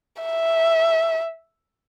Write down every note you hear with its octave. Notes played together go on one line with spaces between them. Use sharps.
E5